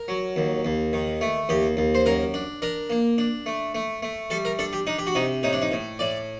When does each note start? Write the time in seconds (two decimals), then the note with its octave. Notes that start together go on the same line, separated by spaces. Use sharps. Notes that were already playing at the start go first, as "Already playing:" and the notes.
Already playing: A#4
0.08 F#3
0.36 D#2
0.65 D#2
0.93 D#3
1.21 A3
1.49 D#2 G4
1.77 D#2
1.95 C5
2.06 F#2 A#4
2.34 D4
2.62 D4 A#4
2.90 A#3
3.18 D4
3.46 A3
3.75 A3
4.03 A3
4.30 G3 A4
4.45 A#4
4.59 D4 A4
4.73 G4
4.87 D4 D#4
4.99 G4
5.07 F#4
5.15 C3 D#4
5.43 A2 D#4
5.53 D4
5.62 D#4
5.72 A2
5.99 A2 D5